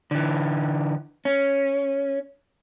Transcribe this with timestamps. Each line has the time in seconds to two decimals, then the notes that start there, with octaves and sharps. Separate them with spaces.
0.11 D3 E3
1.25 C#4